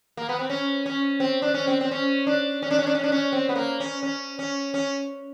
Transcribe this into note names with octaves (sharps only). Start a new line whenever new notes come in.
A#3
B3
C4
C#4
C#4
C4
D4
C#4
C4
C4
C#4
D4
C#4
D4
C#4
D4
C#4
D4
C#4
C4
B3
A#3
C#4
C#4
C#4
C#4